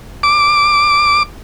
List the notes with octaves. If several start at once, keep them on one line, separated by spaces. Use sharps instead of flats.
D6